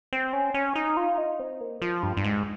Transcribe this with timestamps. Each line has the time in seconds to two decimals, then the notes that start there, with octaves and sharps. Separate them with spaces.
0.13 C4
0.33 C#4
0.54 C#4
0.76 D#4
0.97 F4
1.18 D#4
1.40 C4
1.61 A#3
1.82 F3
2.03 G2
2.17 G2
2.24 G#2